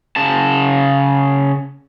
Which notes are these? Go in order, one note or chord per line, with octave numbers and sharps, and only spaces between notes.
C#3 A5